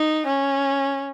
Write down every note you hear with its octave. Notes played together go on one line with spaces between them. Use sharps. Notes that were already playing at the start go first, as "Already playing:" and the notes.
Already playing: D#4
C#4